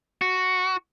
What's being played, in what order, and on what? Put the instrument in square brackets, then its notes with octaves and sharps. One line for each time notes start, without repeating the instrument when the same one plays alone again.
[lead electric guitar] F#4